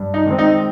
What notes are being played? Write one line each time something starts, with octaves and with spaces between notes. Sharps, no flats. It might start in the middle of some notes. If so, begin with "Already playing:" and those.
Already playing: G2
D#4
D#3 G#3 C4
D#4